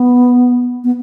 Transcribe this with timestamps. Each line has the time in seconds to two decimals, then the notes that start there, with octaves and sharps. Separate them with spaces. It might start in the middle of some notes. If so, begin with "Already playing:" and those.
Already playing: B3
0.84 B3